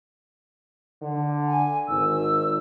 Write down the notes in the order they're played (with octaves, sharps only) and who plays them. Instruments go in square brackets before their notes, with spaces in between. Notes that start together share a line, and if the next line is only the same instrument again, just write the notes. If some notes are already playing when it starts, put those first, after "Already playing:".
[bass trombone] D3
[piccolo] G#5
[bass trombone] G#1 [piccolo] E6